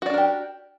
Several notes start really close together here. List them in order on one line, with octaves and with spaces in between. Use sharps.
F#4 D5 D4 A#4 G4